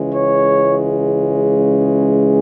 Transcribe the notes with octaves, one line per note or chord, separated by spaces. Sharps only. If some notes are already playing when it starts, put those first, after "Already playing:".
Already playing: C#2 C#3 E3 G#3
C#5